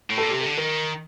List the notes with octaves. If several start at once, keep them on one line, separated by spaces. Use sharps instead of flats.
A2
A4
A#2
C3 G4
A4
D3
D#3 A#4